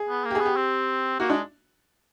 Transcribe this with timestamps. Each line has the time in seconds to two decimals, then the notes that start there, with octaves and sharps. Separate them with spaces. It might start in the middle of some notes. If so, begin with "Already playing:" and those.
Already playing: G#4
0.09 B3
0.25 A#3
0.31 G4
0.35 B3 G#4
0.46 G4
0.56 C4
1.20 A#3 F#4
1.30 G#3 D4